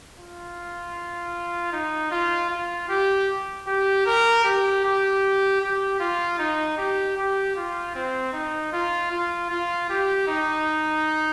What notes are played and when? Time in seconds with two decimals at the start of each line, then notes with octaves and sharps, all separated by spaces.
0.17 F4
1.73 D#4
2.11 F4
2.50 F4
2.89 G4
3.67 G4
4.06 A#4
4.44 G4
4.84 G4
5.62 G4
6.00 F4
6.39 D#4
6.78 G4
7.17 G4
7.56 F4
7.95 C4
8.33 D#4
8.73 F4
9.12 F4
9.50 F4
9.89 G4
10.28 D#4